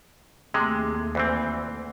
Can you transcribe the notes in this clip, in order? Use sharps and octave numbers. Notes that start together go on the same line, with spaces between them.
D#2 C3 G#3 A3
D2 E3 C4